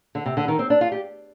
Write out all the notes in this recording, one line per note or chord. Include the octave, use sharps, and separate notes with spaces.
D3
C3
D3
D#3
C4
D4
F4
G4